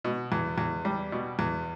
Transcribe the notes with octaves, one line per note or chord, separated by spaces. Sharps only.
B2
E2
E2
G3
B2
E2